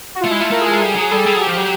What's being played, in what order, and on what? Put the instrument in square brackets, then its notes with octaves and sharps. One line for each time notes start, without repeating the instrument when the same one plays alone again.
[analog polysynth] F#4
F4
[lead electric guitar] A3
[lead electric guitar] G#3 [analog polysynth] E4
[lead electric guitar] A3 [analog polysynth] F4
[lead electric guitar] A3 [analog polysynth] A#4
[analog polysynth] G#4
[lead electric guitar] G#3 [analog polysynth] A4
[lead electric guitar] G3 [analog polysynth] G#4
[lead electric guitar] F#3 [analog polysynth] G#4
[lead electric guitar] G3 [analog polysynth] A4
[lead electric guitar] G3 [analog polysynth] G#4
[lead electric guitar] F#3 [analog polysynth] G4
[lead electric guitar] F3
F#3